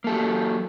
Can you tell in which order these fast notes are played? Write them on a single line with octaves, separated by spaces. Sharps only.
A#3 A4 G4 F#3